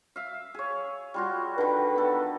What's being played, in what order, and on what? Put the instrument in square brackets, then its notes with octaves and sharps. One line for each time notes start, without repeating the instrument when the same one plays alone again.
[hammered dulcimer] E5 F5
G#4 C#5
G3 F4 F#4
[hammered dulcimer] D3 D#3 [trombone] B4
[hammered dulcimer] B3 A4